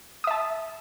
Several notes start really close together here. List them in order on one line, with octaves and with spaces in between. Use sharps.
D#6 E5 A5